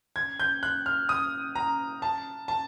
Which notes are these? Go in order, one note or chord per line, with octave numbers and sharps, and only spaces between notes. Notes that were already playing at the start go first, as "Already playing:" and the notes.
G#6
G6
F#6
F6
D#6
A#5
A5
A5